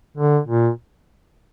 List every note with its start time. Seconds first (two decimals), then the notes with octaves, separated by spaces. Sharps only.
0.17 D3
0.48 A#2